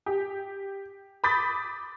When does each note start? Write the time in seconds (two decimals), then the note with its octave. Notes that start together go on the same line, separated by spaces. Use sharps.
0.06 G4
1.24 B5 D6 D#6 G6 A6 B6